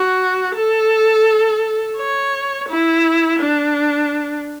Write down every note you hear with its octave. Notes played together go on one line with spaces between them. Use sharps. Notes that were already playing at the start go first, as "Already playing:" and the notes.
Already playing: F#4
A4
C#5
E4
D4